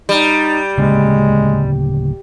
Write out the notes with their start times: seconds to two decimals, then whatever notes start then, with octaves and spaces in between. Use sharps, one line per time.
0.09 G3 D#4
0.77 D1 C#3 G#3 A#3